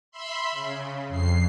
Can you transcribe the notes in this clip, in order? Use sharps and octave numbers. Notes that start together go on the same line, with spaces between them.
E5 B5 C6
C#3
F2 C7